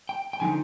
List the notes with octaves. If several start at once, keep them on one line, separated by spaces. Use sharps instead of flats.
G5
G5
D3 F3 C4 D#4 G#5